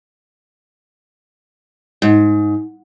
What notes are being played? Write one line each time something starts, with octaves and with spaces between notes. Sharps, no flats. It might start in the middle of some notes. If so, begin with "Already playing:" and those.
G#2